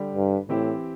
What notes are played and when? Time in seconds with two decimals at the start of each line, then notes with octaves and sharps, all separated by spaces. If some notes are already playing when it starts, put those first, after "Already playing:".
Already playing: D3 G3 D4 G4
0.14 G2
0.49 A2 E3 C4 E4 G4